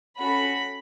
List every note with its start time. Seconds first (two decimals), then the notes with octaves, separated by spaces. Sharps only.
0.18 C#4 F#4 A4 B5